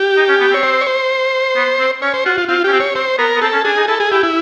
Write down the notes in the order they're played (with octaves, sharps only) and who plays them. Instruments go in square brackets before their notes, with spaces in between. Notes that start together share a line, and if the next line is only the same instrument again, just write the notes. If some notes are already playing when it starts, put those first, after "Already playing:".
Already playing: [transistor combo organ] G4
[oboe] D#4
C#4
B3
[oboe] C4 [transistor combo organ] C#5
[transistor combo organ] C5
C#5
C5
[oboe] B3
C4
[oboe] C#4 [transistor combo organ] C#5
[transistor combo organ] C5
[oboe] F4 [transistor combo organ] F#4
[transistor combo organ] F4
[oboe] C4 [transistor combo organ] F4
[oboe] C#4 [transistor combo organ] G4
[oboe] C4
[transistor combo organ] C#5
[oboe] C4 [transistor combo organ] C5
[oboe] B3 [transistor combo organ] A#4
[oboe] B3
[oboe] C4 [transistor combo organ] A4
[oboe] C#4
[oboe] D4 [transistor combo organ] G#4
[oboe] D#4
[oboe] E4 [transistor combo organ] A4
[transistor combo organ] G#4
[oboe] E4 [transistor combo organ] G4
[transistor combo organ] E4